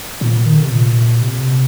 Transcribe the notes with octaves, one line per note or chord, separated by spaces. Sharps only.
A#2
D#3
D3
C3
A#2
C3